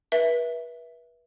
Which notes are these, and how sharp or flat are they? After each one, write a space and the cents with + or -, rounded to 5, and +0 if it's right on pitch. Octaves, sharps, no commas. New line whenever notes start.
B4 -35 E5 +0